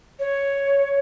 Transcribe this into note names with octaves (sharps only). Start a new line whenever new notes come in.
C#5